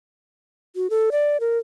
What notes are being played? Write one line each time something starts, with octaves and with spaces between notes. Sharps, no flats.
F#4
A4
D5
A#4